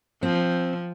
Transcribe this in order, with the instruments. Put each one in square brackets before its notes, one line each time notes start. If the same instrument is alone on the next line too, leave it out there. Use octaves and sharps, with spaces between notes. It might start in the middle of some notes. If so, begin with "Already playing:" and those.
[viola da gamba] F3 [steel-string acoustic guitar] C4